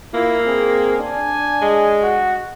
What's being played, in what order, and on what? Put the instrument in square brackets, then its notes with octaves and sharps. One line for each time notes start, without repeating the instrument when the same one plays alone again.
[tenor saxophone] A#3 [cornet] E4 [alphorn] F4
[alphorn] C4 [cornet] G#4
[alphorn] D4 [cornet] G#5
[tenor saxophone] G#3
[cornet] F#4